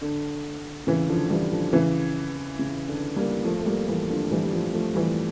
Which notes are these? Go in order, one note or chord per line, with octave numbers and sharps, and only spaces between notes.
D3
C#3 E3
D3 F3
E3 G3
D3 F3
C#3 E3
C#3
D3
G3 A#3
F3 A3
A3
G3 A#3
E3 G3
D3 F3
E3 G3
G3
F3 A3
F3 A3
E3 G3